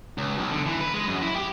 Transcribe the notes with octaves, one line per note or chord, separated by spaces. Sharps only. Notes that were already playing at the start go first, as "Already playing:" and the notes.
C#2
B1
D3
E3
B4
G#3
F#2
E4
G4